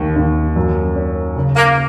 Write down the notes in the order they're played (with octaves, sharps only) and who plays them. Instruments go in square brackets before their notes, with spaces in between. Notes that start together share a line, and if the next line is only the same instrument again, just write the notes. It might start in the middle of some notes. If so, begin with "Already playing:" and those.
Already playing: [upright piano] D#2
D#2
F#2
C#4
C#3
[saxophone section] A#3